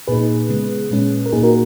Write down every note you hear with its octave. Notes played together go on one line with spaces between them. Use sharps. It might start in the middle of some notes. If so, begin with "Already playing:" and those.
A#2 A#3 D#4 G#4 B4
C#3 G#3 B3
A#2 G#3 C#4
A#4
A#2 A#3 D#4 G#4
F#4 A#4